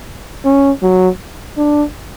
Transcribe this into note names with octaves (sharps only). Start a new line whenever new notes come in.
C#4
F#3
D4